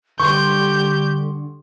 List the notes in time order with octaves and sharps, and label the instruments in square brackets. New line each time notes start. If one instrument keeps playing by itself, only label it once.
[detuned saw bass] D3 [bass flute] G3 [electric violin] G4 G6 [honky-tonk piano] C6 C#6